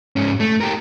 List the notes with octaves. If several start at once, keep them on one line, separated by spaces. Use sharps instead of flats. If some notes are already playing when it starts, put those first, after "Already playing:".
G#2 C#4
A3
G4 A#4